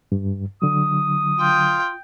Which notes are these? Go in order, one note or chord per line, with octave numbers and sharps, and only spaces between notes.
G2
D3 F#3 D#6
F4 G5